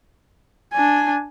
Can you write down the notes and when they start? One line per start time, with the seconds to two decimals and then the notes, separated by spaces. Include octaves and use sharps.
0.73 D4 G#5